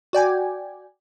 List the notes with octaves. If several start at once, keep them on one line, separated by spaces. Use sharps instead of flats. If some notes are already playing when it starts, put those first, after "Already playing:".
F#4 D5 G5 G#5